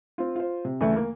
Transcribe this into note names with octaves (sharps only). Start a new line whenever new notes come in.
C4 F4
F4 C5
C3
D2 C#3 E3 A3
A#3